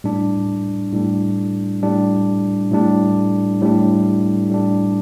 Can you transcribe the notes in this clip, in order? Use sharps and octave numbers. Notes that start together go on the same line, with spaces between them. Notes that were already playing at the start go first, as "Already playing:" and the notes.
A2 G3 D4
A2 G3 D4
A2 G3 D4
A2 G3 D4
A2 G3 D4
A2 G3 D4